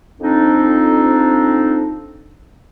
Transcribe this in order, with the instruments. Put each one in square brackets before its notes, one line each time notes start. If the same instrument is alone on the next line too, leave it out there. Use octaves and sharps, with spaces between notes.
[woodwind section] F2 C4 D4 D#4